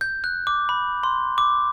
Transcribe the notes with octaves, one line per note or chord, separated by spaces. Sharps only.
G6
F#6
D6
B5
C6
D6